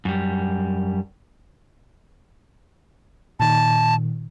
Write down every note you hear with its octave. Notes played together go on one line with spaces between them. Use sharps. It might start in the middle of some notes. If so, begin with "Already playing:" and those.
F#2 G3
A#2 D#3 A5